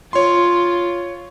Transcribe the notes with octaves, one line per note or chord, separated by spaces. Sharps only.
F4 C#5 C6